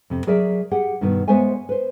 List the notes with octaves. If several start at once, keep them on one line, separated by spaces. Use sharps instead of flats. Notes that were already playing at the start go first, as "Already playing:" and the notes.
F2 C3
F#3 G#4 A#4 D5 E5
G4 G#4 F#5
G2 B2 D#3 B3
G#3 B3 C5 C#5 E5 G#5
B4 C5